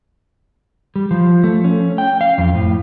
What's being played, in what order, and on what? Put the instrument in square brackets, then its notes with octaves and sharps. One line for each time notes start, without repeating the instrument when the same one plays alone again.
[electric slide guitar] G3
F3
A3
C#4
G5
F5
F2
A2